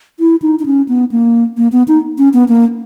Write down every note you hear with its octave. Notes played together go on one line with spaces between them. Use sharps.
E4
D#4
D#4
C#4
B3
A#3
A#3
B3
D#4
C#4
B3
A#3